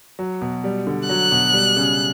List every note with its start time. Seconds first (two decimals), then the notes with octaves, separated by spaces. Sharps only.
0.19 F#3
0.41 B2
0.64 G3
0.87 D3
1.09 F#3 F#6
1.32 B2
1.54 G3
1.76 C#3